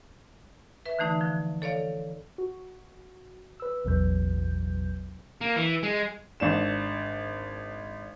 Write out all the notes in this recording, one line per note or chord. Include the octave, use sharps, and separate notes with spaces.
B4 E5
D3 E3 A3 D#4
D3 F3
A4 C#5 D5 F5
F#4
B4 E6
A1 E2 B2 F#3 B4 G6
A#3
E3
G#3
G#1 D4 E7